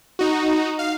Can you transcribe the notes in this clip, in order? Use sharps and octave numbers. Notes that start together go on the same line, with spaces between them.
D#4 F#4
F5